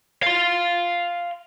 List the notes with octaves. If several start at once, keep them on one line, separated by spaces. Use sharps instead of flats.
F5 C6